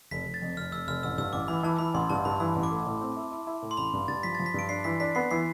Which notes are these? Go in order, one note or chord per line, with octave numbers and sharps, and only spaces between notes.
F1 B6
F1
A6
F2
F1 F6
F1 E6
F1 F6
A1 E6
G2 E6
A1 D6
E3 B5
E3 A5
E3 B5
A1 C6
G2 A5
G2 B5
E3 B5
A1
D6
A3
A2
C4
E4
E4
E4
A2
C6
A1 B5
G2
G2 A6
F3 B6
A6
F3
B6
G2 D7
D4 C7
E3 B6
D4 B6
B3 C7
E3 C7